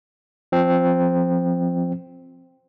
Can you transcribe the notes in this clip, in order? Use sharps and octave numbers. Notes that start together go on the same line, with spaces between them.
F3 C4